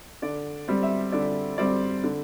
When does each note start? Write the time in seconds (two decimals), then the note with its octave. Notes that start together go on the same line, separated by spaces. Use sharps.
0.22 D3 D5
0.68 G3 C4
0.83 E5
1.12 D3 D5
1.58 G3 C4 D5
2.04 D3